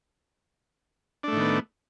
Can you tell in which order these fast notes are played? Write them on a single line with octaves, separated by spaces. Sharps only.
D4 A3 A2 D#3 B3